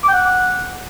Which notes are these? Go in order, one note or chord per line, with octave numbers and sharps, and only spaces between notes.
D6
G5
F#5